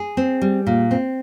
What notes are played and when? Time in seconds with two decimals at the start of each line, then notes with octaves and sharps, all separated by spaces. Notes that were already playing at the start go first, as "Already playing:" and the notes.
Already playing: G#4
0.17 C4
0.42 G3
0.67 A#2
0.91 C4